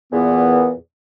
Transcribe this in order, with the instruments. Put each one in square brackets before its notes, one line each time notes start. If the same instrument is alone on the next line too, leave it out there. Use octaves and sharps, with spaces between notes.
[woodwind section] E2 A#2 E3 B3